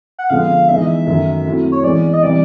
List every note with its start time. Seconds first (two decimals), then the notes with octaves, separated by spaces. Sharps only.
0.19 F#5
0.30 D3 F3 G#3 B3 F5
0.68 E3 G#3 B3 D#4 E5
0.78 D#5
0.88 E5
1.07 F#2 D#3 F#3 A3
1.46 F#3 A3 C4 E4
1.72 C#5
1.83 E3 G#3 B3 D5
2.13 D#5
2.23 C3 E3 G3 D5